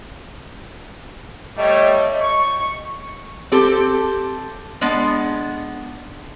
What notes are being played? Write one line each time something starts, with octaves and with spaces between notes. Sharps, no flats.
G3 A3 C#5 D#5
C#6
C4 G4 A4
G#3 B3 D4